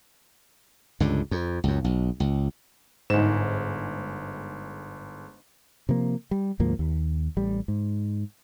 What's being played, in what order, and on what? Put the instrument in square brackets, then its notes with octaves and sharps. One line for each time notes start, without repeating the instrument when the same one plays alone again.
[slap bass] C#2 G2 D3
F2
C#2 F#2
B1
C#2
[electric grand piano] G1 E7 [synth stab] G#2
[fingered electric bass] C3 F3 A#3
G3
D2 G#2 F3 A#3
D#2
A1 G3
G#2